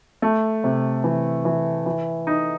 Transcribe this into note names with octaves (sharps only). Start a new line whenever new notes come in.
A3
C3
E3
E3
E3
D#4